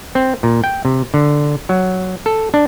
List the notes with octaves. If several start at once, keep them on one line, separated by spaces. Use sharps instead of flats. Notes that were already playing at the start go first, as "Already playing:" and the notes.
C4
A#2
G5
C3
D3
F#3
A4
D4